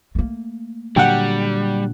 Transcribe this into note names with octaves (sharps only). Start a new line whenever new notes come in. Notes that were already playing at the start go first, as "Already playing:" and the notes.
A3 A#3
A#2 D3 F#3 G3 F#5 G5